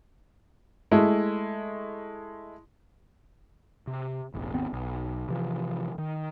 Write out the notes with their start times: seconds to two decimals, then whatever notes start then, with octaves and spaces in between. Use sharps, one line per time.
0.91 G#3 A3 E4
3.87 C3
4.34 E1 A1
4.53 G#1 D#2 B3 C4
4.73 B1
5.29 C3 E3 F3
5.98 D#3